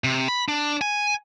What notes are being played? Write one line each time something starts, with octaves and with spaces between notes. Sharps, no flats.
C3
B5
D4
G#5